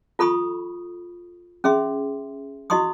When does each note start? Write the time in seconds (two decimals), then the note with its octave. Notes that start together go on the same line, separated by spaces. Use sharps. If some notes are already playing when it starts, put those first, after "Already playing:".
0.19 F4 A4 B5 C#6 D#6
1.64 C#4 G#4 E5 C6
2.70 E4 F#4 D#5 C6 C#6 D#6